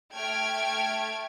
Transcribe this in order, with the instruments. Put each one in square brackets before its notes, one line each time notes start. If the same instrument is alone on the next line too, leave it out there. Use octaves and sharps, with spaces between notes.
[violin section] A3 G5 F6 G#6 D7